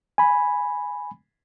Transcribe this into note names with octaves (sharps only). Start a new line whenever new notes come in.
G#5 B5